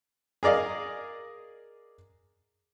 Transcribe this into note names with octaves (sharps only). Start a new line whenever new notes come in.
G#4 A#4 D5 D#5 F5